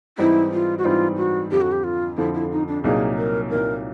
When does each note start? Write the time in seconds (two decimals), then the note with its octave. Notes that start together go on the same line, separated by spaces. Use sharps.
0.18 G#2 E3 G3 C4 D#4 E4
0.51 F4
0.78 F#4
0.84 G#2 E3 G3 C4 D#4 F4
1.17 F#4
1.51 F2 D3 F3 G4
1.61 F#4
1.72 G4
1.84 F4
2.17 F2 D3 F3 E4
2.34 E4
2.51 D#4
2.68 D4
2.84 C2 A#2 F#3 A#3 D#4 G#4
3.18 A#4
3.50 C2 A#2 F#3 A#3 D#4 A#4